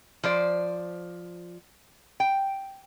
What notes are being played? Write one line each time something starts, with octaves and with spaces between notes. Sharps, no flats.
F3 C5 D5
G5